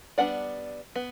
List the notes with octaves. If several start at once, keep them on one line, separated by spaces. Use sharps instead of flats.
G3 B3 D4 D5 F#5
B3